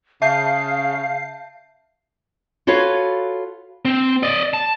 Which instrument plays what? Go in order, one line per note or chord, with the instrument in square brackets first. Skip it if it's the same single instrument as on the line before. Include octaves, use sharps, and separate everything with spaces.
[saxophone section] C#3 [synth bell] E5 A5 G6 [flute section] F5 [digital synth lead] C7
[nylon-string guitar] F4 F#4 A4 B4 C#5 F5
[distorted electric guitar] C4
D5 D#5
A5